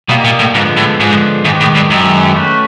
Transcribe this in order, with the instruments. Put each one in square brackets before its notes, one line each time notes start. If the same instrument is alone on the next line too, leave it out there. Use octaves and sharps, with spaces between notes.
[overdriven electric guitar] B2 [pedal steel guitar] G3 A#3 D#4
[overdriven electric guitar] A#2
A2
[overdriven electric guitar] G#2 [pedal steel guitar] D3 F3 G#3 B3
[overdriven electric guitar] A2
[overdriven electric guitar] G#2 [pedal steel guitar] D3 F3 G#3 B3
[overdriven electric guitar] G#2 [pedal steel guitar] D#3 G#3 B3 D#4 G4
[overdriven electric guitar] A2
G2
[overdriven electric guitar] F#2 [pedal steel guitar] D#3 G#3 B3 D#4 G4
[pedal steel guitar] A3 C#4 F#4 B4